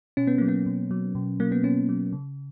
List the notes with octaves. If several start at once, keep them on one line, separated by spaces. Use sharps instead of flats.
B2 C#4
B3
F#3 A#3
B3
B2
F#3
B2
F#3 A#3
B3
B2 C#4
F#3
C#3